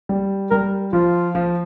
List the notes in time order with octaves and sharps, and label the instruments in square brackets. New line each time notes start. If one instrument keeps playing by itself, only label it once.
[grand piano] G3
[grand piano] G3 [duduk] A#4
[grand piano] F3 [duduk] F4
[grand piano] F3